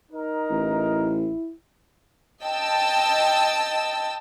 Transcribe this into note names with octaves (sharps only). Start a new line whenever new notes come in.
D#4 A#4
A1 E4
D#5 G5 A5 E6